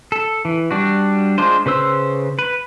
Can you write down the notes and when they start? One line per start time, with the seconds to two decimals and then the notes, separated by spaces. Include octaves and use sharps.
0.12 A4
0.45 E3
0.71 G3 D4 F#4
1.38 G#3 D4 F4 C5
1.66 C#3 B4 C5 E6
2.39 B4